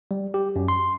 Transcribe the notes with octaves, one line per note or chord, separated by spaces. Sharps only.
G3
G4
F#2
C6